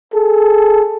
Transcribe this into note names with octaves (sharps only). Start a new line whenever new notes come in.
G#4 A4